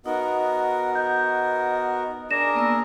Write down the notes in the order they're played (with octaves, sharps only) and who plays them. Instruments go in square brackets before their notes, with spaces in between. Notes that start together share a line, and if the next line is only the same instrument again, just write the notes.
[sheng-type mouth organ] B3 F#4 A#4 [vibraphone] D#4 [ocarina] D#5
[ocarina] D#5 [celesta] G6
[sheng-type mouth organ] D4 G#4 A#4 [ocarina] D5 [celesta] A#6 E7
[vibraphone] A#3 B3 E6